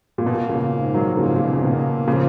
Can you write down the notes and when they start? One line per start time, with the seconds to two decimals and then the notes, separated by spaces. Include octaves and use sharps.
0.18 A#2
0.26 B2 A#3
0.49 A#2 C#3
0.72 G#2
0.94 D#3 F#3
1.17 C#3 F3 A#3
1.36 A#2
1.45 B2
1.53 C#3
1.62 B2 D#3 A#3
2.07 A#2 C#3 F3